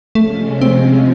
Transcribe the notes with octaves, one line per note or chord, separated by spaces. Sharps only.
C3 F3 G#3 A3 C#4
C4